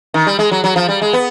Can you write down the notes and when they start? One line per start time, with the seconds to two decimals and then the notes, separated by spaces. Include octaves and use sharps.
0.14 D#3
0.27 G3
0.39 G#3
0.52 F#3
0.64 F#3
0.76 F3
0.89 G3
1.02 G#3
1.13 B3